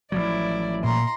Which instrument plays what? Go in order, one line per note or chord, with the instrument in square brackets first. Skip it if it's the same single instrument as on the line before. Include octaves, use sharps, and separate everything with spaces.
[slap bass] A1 F3 F#3 [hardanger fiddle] E4 D5
[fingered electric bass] A#2 [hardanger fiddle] A#5 C6